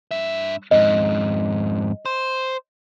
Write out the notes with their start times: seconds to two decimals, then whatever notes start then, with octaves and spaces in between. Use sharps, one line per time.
0.11 G2 E5
0.71 F2 G#2 D#5
2.06 C5